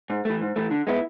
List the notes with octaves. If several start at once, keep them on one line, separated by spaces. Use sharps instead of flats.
G#2
E3 A3
G#2
E3 A3
D3
G#3 B3 E4